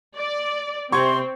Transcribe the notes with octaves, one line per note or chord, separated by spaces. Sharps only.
D5
C3 C4 C6 C#6 G#6